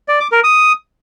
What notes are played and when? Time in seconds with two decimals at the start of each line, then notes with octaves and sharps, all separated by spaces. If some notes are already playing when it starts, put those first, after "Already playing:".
0.08 D5
0.20 D6
0.32 A#4
0.44 D#6